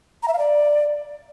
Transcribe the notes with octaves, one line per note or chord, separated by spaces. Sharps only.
A#5
E5
F5
D5